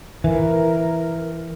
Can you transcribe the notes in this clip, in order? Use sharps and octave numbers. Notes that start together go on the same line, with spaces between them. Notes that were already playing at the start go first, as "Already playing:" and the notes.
E3 A#4